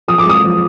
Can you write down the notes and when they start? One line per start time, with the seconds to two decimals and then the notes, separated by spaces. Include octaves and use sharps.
0.08 F3 D#6
0.18 D6
0.26 G#3 D#6
0.44 F3